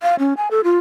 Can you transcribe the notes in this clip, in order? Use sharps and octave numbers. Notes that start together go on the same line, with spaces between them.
F5
C#4
G#5
A4
F4